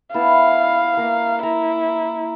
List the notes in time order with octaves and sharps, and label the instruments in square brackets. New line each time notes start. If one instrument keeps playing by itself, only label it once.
[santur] B3 E4 A5 [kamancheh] F5
[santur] A#3 A#5
[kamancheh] E4 [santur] A#5